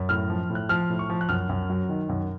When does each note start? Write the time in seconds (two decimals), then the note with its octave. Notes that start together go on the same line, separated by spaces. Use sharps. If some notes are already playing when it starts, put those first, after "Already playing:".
Already playing: F#2
0.09 A2 F6
0.30 F3
0.50 A2
0.55 F#6
0.69 F3 F6
0.90 A2
0.99 C#6
1.10 F3
1.21 F#6
1.29 F#2 F6
1.49 F#2
1.70 F#3
1.89 D#3
2.09 F#2